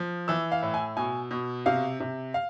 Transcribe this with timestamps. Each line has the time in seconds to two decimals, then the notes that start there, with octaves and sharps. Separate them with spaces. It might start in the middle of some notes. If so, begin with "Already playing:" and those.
Already playing: F3
0.28 E3 E6
0.52 F5
0.62 A2
0.74 G#5
0.97 B2 G#5
1.31 B2
1.66 C3 F5
2.00 C3
2.34 F5